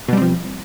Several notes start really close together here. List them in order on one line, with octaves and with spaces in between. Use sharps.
B2 G3 C4 F3